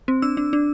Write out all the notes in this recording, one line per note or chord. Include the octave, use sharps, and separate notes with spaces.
C4
D4 E6
D4
D4